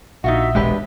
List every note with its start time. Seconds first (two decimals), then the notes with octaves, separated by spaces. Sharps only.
0.24 A#1 D#4 F4 F#4 E5
0.55 E1 G#3 D4 G4 B4